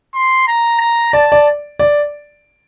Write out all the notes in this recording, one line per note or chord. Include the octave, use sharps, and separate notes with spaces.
C6
A#5
A#5
D5 A5
D5
D5